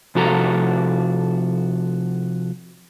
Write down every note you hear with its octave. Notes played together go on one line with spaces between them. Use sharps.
C3 F3 F#4 A4 A#5